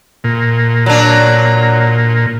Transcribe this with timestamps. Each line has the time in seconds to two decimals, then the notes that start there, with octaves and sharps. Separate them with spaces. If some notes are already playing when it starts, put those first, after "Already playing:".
0.24 A#2
0.86 F#3 D4